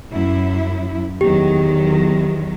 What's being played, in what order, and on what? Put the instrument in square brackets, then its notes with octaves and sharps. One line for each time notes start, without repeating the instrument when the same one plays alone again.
[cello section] F#2 E4
[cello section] E2 D#3 F#3 [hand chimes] G4